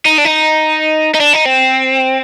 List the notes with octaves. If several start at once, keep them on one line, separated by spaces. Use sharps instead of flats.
D#4
D4
D#4
D#4
D4
D#4
C4